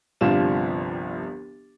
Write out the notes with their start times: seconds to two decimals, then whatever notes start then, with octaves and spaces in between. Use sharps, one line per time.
0.21 G1 C2 F3 D4 F5 E7